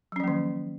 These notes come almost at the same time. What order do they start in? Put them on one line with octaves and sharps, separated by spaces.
F#3 C#4 F3 A#3 D#3